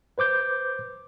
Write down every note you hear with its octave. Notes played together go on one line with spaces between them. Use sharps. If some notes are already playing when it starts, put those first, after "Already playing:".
B4 C5 D6 G6